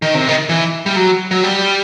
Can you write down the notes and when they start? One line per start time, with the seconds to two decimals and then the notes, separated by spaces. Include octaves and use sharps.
0.02 D#3
0.15 C3
0.28 D#3
0.49 E3
0.86 G3
0.96 F#3
1.31 F#3
1.43 G3